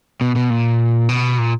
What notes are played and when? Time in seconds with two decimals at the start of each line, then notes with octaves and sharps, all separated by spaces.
0.21 B2
0.36 B2
0.50 A#2
1.09 B2
1.38 A#2